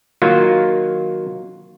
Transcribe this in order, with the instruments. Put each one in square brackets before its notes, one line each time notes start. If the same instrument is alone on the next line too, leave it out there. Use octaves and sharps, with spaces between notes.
[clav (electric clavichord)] D#3 F#3 A#3 F4